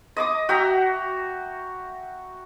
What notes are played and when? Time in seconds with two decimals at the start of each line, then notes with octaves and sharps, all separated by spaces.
0.17 D#5 D6 D#6
0.49 F#4 E5 G5 A#5